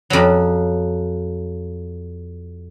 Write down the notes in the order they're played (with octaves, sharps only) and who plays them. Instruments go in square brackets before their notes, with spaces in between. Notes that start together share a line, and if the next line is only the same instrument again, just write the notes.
[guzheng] F2 F#3